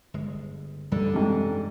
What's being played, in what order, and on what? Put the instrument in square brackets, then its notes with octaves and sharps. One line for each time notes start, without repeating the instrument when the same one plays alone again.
[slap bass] G1 G#3
[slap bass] F#2 E3 A3 [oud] D3 [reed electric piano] G3
[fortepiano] G#2 C3